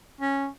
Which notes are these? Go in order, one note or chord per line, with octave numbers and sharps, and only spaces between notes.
C#4